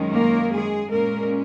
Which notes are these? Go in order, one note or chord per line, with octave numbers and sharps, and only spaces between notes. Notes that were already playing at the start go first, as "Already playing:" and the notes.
Already playing: F#2 D#3 G#3 C#4
A#3 A#4
G#3 G#4
A#2 G#3 A#3 C#4 A#4